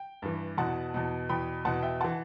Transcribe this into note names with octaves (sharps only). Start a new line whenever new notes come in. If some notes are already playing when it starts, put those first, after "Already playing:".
Already playing: G5
G2 E3
E2 B2 F#5 A5
E2 B2
E2 B2 G5 B5
E2 B2 F#5 A5
E5 G5
E3 F#5 A5